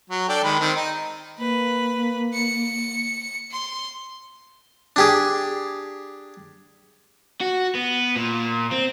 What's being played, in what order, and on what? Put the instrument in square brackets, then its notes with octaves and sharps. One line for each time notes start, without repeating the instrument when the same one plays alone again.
[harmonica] F#3
D4 A4 G5
D#3 G#3 B5
D#3 C4
D#4
[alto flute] A#3 [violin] B4
[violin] C#7
C6
[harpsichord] D4 G4 G#4
[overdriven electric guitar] F#4
B3
A#2
C4